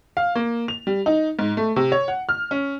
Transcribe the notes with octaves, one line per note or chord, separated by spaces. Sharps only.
F5
A#3
F7
G3
D#4
G#2
A3
C3
C#5
F#5
F6
C#4